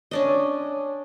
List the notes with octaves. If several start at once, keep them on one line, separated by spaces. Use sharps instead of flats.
C#4 D4 D#5